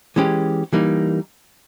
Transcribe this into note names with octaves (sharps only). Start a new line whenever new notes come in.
E3 G#3 C#4 G4
E3 G3 A#3 D#4